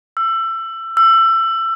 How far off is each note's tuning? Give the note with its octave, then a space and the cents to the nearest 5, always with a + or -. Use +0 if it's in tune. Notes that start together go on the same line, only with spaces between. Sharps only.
E6 +25
E6 +25